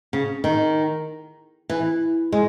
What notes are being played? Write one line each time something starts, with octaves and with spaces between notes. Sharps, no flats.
C#3
D#3
E3
G#3